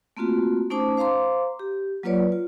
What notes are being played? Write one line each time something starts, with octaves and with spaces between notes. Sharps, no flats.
A3 A#3 C4 F4 F#4
A3 C#4 D#4 C5 A5 D6
C5 F5 A#5 C6 D6
G4
F#3 A#3 F4 B4 C#5 D5
F4